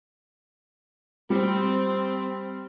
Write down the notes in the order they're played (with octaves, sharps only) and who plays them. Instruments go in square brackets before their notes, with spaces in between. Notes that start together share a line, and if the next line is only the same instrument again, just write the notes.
[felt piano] G3 [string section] C4